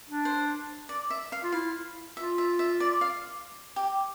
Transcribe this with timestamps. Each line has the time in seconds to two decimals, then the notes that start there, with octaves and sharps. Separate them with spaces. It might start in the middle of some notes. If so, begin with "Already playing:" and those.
0.09 D4
0.25 C5
0.89 D5
1.10 E5
1.32 F5
1.43 F4
1.52 E4 F5
2.17 F4 E5
2.38 E5
2.59 E5
2.80 D5
3.01 F5
3.76 G4